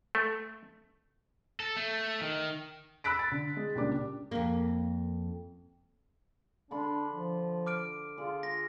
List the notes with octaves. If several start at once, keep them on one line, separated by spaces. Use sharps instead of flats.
A3
A4
A3
D#3
B5 E6 F#6 B6 D7
A6
D3
G#3
C#2 A#2 G3 D4 D6
F2 A#3
D3 D4 B5 C6
F3
D6 F6 D7
D3 F4 G#4
C6 A#6